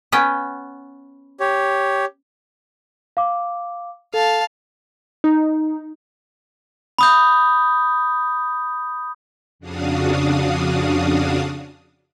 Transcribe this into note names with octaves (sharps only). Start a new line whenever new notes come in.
B3 C#4 G5
G4 C#5
F5 D6
A4 F5 A5
D#4
B5 D#6 G6
F2 C#3 D4 F#4 F5 D#6